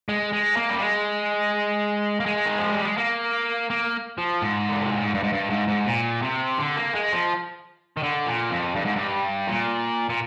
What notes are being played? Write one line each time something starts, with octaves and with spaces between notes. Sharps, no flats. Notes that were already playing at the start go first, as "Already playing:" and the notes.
G#3
G#3
A#3
G3
G#3
A#3
G#3
D#3
F3
G3
G#3
A#3
A#3
F3
G#2
D3
C3
A#2
G#2
G2
G#2
G2
G#2
G#2
A#2
C3
D3
A#3
G#3
F3
D#3
D3
A#2
F2
G2
G#2
G2
A#2
A#2